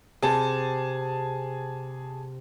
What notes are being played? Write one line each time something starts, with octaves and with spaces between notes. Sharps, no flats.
C3 G#4 A5